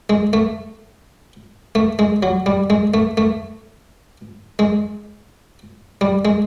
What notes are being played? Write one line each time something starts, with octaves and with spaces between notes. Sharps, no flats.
G#3
A3
A3
G#3
F#3
G3
G#3
A3
A3
G#3
G3
G#3